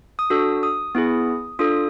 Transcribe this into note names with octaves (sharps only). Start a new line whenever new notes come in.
D#6
D4 F#4 A4 E6
D#6
B3 E4 G#4
D4 F4 A4 D#6